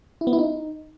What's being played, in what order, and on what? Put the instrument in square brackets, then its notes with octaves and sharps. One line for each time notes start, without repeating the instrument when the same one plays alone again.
[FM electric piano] E4
B3
E4
D#4